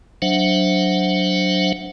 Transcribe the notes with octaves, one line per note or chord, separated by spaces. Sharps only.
F#3 D4 C5 E5 F#5